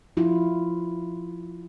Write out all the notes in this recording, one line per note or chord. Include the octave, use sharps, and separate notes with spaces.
F3 E4 F4